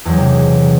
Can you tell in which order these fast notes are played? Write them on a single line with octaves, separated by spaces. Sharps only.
E2 F#3 G#3 C3